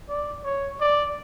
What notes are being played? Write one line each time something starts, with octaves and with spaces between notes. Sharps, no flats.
D5
C#5
D5